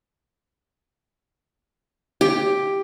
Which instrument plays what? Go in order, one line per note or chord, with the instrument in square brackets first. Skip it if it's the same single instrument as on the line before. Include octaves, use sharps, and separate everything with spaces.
[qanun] G4